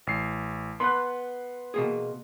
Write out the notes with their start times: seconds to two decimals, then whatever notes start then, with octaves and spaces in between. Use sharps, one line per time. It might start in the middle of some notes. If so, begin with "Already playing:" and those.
0.07 A1 C7
0.80 B3 B4 B5 C6 F#6
1.74 B2 A#3 G#4